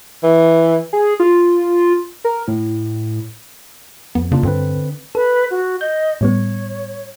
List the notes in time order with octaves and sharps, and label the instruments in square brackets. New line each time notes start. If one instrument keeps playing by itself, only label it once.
[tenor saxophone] E3
[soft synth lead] G#4
F4
A#4
A2
[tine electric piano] F2 [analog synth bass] B3
[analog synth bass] C#3 [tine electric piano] A#3 D4 F4
[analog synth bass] G2 [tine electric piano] D3 C4 B4
[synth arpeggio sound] A4 [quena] B4
[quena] F#4
[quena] D#5 [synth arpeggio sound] G6
[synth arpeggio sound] A2 G3 B3 [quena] C#5